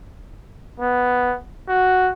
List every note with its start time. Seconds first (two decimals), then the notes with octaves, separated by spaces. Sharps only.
0.80 B3
1.68 F#4